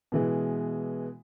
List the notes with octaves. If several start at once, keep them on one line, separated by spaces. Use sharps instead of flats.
B2 E3 G#3